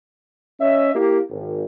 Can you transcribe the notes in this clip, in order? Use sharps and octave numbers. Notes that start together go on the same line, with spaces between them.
C#4 D#5 E5
A#3 E4 G4
G#1